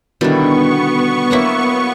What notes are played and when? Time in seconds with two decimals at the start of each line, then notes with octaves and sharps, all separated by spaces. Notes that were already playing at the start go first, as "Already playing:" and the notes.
0.21 B2 D3 D#3 G3 B3 E4 C#6
1.31 F#3 A#3 E4 E5 A#5